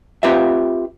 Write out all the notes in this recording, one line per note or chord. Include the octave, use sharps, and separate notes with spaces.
C4 F4 G4 B4 E5